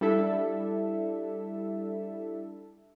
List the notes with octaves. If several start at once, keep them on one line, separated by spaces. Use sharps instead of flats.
G3 D4 E4 A4 E5